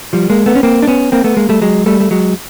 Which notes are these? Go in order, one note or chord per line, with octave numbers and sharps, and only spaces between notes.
F3 G3
G#3 A#3
A3 B3
C#4
A#3 C4
D4
B3 C#4
A#3 C4
A3 B3
G#3 A#3
G3 A3
F#3 G#3
G3 A3
A3
F#3 G#3